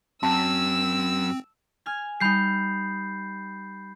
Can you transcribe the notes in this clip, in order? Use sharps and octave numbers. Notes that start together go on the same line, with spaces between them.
F#2 C4 A5 E6
G#5 F6 G#6
G3 D#4 B5 G6 C7